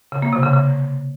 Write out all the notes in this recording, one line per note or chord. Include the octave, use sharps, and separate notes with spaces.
C#3
A#3
C3
C#3
C#3